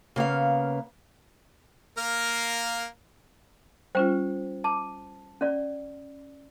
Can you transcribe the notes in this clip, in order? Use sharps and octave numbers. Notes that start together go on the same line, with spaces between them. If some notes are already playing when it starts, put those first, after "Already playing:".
C#3 A#3 B3 F5
A#3 A#4 F5
G3 C#4 F4 C5 G5
A5 D6
C#4 D5